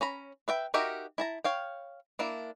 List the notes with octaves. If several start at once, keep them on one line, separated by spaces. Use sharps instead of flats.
C#4 A#5 B5
B4 E5 G5
D#4 F#4 G4 A#4 E5
E4 A5 A#5
C#5 F5 G5
A#3 D4 E4